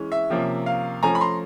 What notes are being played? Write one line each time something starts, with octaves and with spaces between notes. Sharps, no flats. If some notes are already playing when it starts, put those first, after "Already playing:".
Already playing: E3 G#3 C#4
E5
C3 F3 A#3 C#4
F5
F3 A3 C#4 G#5 A#5
B5
A#5 C6